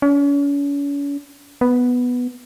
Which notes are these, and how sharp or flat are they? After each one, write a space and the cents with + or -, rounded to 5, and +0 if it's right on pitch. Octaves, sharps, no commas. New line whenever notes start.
C#4 +40
B3 +0